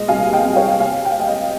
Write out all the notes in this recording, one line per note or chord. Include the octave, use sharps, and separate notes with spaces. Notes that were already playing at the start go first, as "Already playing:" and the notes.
Already playing: A#2 G#3 D#5
C2 F5 G#5
D#5 G5
C4
C#5 F5
G5
C3 F5 G#5
G5
F5
G3 D#5 G5
D#5 G5